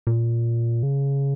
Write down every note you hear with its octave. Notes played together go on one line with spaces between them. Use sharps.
A#2
C#3